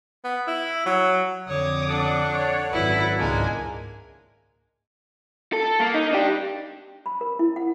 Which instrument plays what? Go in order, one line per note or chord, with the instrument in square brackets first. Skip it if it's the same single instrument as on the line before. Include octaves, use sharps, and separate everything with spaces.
[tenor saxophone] B3
E4
F#3
[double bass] F2 D3 [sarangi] C#5 [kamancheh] D6 D#6
[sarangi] D4 [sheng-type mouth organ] A4 D5 F#5
[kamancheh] C#5
[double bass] G#1 F#2 [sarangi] E4 [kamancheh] B4
[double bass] C#2 G#2 [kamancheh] G#3 G#5 [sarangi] A#3 [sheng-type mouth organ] D4 A#4
[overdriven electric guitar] A4
A#3
D#4
D4 G4
[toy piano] B5
A#4
E4
F#5